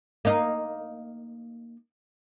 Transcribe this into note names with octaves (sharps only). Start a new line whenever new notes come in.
A#3 D#4